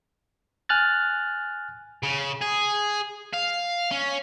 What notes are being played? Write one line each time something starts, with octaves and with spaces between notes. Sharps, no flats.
G#5 F6 F#6 A6
C#3
G#4
F5
C#4